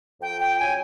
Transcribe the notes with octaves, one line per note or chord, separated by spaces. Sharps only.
F2 G5
G5
C#3 F#3 G#5